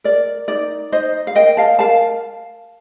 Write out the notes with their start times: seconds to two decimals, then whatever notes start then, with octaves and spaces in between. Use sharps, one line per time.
0.04 A#4 D5
0.48 D#4 D5
0.92 D#4 C5 D#5
1.27 F5
1.35 A#4 D#5 G5
1.57 F5 A5
1.79 A#4 F5 A5